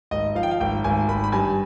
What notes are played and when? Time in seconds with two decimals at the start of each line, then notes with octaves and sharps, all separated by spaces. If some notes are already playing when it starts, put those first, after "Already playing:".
0.11 G#1 D#5
0.35 F3 F5
0.43 G5
0.51 F5
0.60 G#1 G5
0.84 G#1 G#5
1.08 G#1 B5
1.24 B5
1.32 G2 G#5